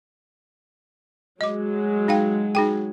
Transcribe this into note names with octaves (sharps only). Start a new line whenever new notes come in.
F#3 G#3 D#5 D6
D#4 F5 G5
D#4 G#4 G5